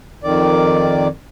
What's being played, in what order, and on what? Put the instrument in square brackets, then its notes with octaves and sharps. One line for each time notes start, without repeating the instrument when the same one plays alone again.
[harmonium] F2 D#3 D5